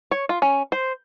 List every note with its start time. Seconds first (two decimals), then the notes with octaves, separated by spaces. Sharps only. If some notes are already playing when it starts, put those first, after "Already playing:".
0.11 C#5
0.29 F4
0.42 C#4
0.72 C5